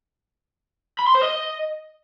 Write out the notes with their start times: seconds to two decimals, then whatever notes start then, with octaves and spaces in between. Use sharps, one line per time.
0.99 B5
1.07 C6
1.15 C5
1.23 D#5